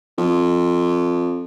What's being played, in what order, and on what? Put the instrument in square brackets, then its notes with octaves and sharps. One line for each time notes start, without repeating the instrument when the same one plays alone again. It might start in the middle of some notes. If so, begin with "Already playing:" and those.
[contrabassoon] F2